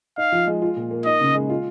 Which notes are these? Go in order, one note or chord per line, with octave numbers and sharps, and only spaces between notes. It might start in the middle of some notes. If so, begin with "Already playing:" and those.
D#4 F5
F3
G#3
F4
A#2
A#3
D#4 D#5
C#3
G#3
F4